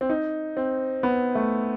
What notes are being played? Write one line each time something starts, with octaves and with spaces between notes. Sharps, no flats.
C4
D#4
C4
B3
A3